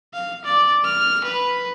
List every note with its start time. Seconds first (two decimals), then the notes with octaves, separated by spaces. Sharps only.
0.13 F5
0.44 D5
0.85 F6
1.24 B4